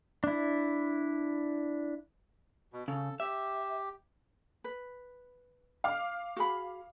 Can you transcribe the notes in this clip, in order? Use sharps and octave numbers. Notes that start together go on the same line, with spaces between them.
D4 E4
B2
C#3 A4
G4 E5
B4
F5 D6 F6
F#4 G#4 B5